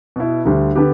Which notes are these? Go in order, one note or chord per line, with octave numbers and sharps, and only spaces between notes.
B2 B3 E4
D2 D3 G3
D3 B3 G4 B4